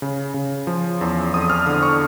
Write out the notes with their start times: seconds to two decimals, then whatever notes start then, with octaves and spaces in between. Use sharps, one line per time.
0.02 C#3
0.34 C#3
0.67 F3
1.01 E2
1.33 F2 D#6
1.50 F6
1.66 D3 D#6
1.83 C#6